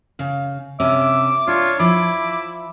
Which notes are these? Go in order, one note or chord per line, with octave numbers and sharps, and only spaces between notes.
C#3 F5
C3 C#4 E5 D6
D4 F4 C#5
F3 E4 D6